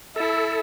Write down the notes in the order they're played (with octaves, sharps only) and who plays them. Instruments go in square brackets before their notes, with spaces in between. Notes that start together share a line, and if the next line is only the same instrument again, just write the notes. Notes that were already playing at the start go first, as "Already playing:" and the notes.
[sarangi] E4 [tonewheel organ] A4